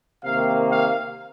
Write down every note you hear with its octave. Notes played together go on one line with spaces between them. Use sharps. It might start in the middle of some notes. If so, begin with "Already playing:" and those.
C3 D#3 A#3 F5
F5